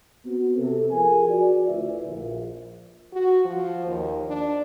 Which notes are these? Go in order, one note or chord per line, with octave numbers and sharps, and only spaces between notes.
B3 C4 F#4
C3 B3 G4 A4
F3 G#4 A#4 G#5
F#4 D5
D2 E4 F4 B4 D5 E5
A#1
F#4
F3
D#2
D4